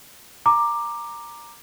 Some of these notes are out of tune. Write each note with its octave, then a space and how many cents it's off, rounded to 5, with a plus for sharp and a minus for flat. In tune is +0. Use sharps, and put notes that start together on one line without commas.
A#5 +0 D6 +15